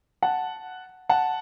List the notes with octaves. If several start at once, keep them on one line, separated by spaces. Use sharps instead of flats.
F#5 A5
F#5 A5